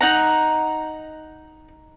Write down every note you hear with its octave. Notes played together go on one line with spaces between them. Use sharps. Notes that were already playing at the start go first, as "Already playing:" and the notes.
D#4 F#5 A#5